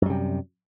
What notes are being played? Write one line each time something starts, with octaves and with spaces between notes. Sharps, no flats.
F#2 C3 G3